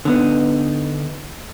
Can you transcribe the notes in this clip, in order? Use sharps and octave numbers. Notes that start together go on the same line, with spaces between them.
D3 B3 D#4